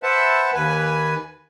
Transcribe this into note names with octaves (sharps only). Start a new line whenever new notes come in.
B4 C5 E5 F#5 A5
D#2 B4 G#5